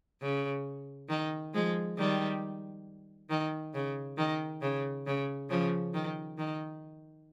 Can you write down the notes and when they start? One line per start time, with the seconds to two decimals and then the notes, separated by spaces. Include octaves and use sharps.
0.21 C#3
1.09 D#3
1.54 F3 G#3
1.98 D#3 G3
3.30 D#3
3.74 C#3
4.18 D#3
4.62 C#3
5.07 C#3
5.50 C#3 F3
5.94 D#3
6.38 D#3